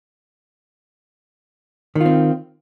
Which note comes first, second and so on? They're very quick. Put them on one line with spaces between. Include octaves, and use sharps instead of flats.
D#3 F4 C4